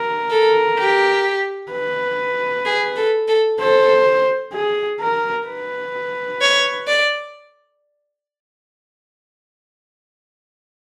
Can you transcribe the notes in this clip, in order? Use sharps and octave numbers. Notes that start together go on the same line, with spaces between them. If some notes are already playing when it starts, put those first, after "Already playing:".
Already playing: A#4
A4
G4
B4
G#4
A4
A4
A4 C5
G#4
A#4
B4
C#5
D5